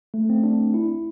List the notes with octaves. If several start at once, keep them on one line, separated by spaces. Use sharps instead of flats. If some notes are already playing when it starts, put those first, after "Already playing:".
A3
C4
D4
E4